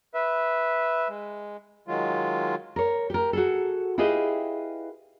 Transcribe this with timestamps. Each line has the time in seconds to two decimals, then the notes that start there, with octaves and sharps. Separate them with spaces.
0.14 B4 E5
1.09 G#3
1.88 D#3 F#3 G#3 F4
2.76 A#4 C#5
3.10 G4 A#4
3.33 F#4 G#4 A4
3.98 E4 F4 G4 G#4 B4 D#5